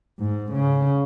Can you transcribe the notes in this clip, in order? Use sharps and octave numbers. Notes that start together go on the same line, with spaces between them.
G#2
C#3